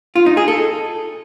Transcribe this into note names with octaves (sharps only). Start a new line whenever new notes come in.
F4
D#4
G#4
A4